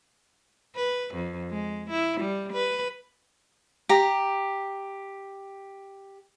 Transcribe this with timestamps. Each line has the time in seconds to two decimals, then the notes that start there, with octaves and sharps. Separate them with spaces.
0.76 B4
1.15 F2
1.50 G#3
1.90 E4
2.21 G3
2.53 B4
3.89 G4 A#5